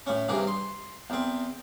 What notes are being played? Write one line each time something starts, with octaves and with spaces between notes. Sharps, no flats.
A2 C#4
G2 C3 E3 G#4
C6
E2 C4